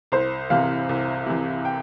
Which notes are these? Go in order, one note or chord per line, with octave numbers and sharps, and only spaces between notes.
C2 C5
C3 E3 F5
C2
C3 E3
G5